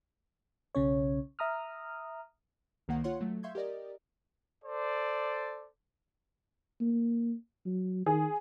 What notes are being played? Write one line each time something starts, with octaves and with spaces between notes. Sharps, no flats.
B1 C#3 C#4 C#5
E5 A#5 D#6 F6
C2 D#3 A#3 F#5
F4 C#5 F#5 C6
F#3 A3
E5 F5 C6 C#6 G6 G#6
G4 A#4 D5 D#5
A4 C5 D5
A#3
F#3
D#3 G#4